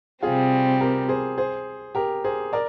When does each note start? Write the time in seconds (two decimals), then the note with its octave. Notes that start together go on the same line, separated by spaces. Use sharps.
0.23 C3 G3 C4 F4 G#4
0.80 G4 A#4
1.09 G#4 C5
1.38 G#4 C5
1.95 G4 A#4
2.24 G#4 C5
2.53 A#4 D5